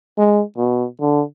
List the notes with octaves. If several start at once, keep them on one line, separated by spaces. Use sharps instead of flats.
G#3
B2
D3